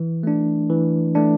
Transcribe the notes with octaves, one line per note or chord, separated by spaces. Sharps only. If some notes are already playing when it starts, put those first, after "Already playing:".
Already playing: E3
A3 D4
E3
A3 D4